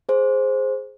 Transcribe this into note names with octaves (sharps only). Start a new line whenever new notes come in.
G#4 C5